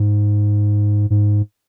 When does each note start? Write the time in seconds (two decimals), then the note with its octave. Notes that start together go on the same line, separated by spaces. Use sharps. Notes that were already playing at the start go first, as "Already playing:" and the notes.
Already playing: G#2
1.10 G#2